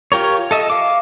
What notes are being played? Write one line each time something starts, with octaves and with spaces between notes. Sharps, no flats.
F4 G4 A#4 C#5
A4 D#5 E5
F5 D6